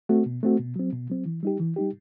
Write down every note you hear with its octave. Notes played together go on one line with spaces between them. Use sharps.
A3 C4 F#4
B2
A3 C4 F#4
B2
F#3 C4
B2
F#3 C4
E3
G3 D#4 G4
E3
G3 D#4 G4